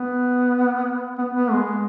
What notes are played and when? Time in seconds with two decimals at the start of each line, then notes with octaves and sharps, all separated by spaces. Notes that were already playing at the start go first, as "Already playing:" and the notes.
Already playing: B3
1.19 B3
1.33 B3
1.51 G#3